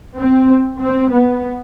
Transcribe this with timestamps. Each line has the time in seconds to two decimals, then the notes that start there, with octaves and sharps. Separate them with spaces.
0.16 C4
0.79 C4
1.11 B3